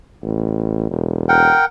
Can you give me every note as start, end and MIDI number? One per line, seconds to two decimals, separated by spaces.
0.23 0.90 33
0.91 1.53 28
1.29 1.65 70
1.29 1.65 78
1.29 1.65 79